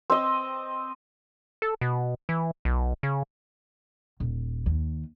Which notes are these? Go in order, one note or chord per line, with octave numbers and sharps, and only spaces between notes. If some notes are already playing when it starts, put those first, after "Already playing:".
C4 D#5
A4
B2
E3
B1
C#3
D#1
D#2